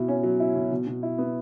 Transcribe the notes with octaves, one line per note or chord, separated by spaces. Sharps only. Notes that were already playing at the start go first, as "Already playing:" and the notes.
Already playing: B2 E4
C#4
F#3
E4
B2
B2
B2
E4
B3